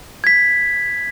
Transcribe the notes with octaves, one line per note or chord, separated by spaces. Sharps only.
G#6 B6